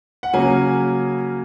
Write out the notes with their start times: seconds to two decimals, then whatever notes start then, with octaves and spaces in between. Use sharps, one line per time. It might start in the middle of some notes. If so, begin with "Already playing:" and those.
0.23 F#5
0.34 C#3 F#3 A#3 C#4 G#5